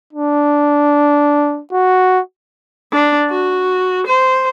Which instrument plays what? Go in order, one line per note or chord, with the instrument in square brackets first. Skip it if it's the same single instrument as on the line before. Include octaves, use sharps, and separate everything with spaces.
[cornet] D4
F#4
[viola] D4
F#4
C5